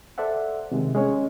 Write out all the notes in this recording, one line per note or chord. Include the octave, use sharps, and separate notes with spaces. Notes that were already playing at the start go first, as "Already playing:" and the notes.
A4 C5 D5 E5 F#5
C3 D#3 G#3
G#3 C#4 C#5